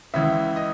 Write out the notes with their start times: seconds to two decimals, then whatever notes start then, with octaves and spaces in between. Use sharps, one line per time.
0.14 C#2 C#3 E3 E5
0.56 D#5